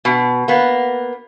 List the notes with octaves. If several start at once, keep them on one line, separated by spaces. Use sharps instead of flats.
B2
A#3 B3